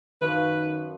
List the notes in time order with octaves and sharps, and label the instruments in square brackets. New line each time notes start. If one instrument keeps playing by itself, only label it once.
[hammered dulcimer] F#2 F3 C#6 [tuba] D#3 [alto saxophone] B4